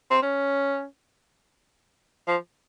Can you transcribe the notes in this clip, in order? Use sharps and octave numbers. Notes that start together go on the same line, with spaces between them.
C4
C#4
F3